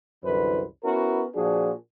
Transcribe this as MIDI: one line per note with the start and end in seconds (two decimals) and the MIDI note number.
0.24 0.63 36
0.24 0.63 42
0.24 0.63 50
0.24 0.63 52
0.24 0.63 71
0.24 0.63 72
0.84 1.24 59
0.84 1.24 61
0.84 1.24 64
0.84 1.24 66
0.84 1.24 70
0.84 1.24 71
1.35 1.72 46
1.35 1.72 53
1.35 1.72 62
1.35 1.72 66
1.35 1.72 68